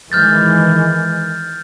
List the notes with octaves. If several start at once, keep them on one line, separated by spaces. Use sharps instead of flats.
D#3 E3 G#3 F6 G6 A6